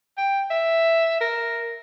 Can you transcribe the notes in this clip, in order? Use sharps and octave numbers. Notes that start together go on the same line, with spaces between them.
G5
E5
A#4